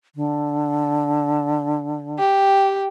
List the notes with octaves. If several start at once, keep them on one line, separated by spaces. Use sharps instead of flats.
D3
G4